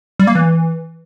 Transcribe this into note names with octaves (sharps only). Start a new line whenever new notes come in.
G3
A#3
E3